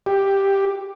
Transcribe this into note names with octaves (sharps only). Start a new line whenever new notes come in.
G4